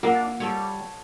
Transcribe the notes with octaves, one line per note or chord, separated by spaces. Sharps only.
A#3 D4 F4 F#5 E6
G3 A4 C#5